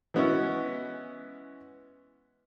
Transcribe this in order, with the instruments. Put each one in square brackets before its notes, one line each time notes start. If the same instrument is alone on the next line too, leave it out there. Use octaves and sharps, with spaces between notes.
[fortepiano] E3 G#3 B3 C#4 E4 F#4